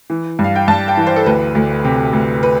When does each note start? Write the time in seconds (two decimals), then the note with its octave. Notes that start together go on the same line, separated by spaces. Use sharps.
0.10 E3
0.39 G2
0.44 F5
0.56 G5
0.68 G2 A5
0.88 G5
0.97 E3
1.07 C5
1.16 A4
1.26 D2 B4
1.55 D2
1.84 C3
2.13 D2
2.43 B4